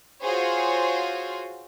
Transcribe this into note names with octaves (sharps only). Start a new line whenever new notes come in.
F4 F#4 G#4 C5 C#5